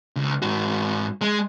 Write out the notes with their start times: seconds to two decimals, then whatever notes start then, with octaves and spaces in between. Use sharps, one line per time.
0.16 C#2
0.42 G#2 F#4
1.21 G#3